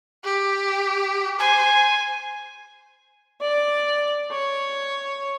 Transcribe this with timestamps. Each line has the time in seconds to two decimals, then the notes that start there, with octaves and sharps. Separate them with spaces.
0.24 G4
1.40 C5 G#5
3.41 D5
4.32 C#5